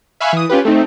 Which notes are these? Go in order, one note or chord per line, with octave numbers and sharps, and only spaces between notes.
E5 F5 G#5 B5 C#6 F#6
E3 D#6
C#4 F4 G4 B4
A3 C4 D#4